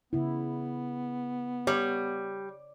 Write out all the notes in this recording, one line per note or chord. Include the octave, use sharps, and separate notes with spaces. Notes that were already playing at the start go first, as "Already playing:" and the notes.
C#3 B3 E4
G3 C#5